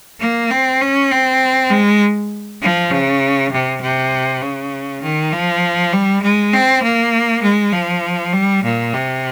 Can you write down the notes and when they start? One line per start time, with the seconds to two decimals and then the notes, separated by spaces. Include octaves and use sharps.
0.20 A#3
0.50 C4
0.81 C#4
1.11 C4
1.70 G#3
2.62 F3
2.91 C#3
3.52 C3
3.82 C3
4.42 C#3
5.03 D#3
5.33 F3
5.93 G3
6.22 G#3
6.53 C4
6.83 A#3
7.43 G#3
7.73 F3
8.33 G3
8.64 A#2
8.94 C3